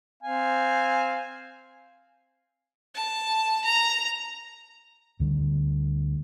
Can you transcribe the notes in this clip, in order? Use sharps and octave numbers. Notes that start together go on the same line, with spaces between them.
C4 F5 G#5
A5
A#5
D2 D3 G3